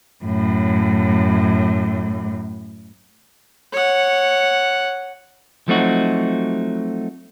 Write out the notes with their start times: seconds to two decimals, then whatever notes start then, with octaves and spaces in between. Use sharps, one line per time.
0.25 F#2 A2
3.72 C#5 F#5
5.68 F3 F#3 A3 C4 D#4 F#4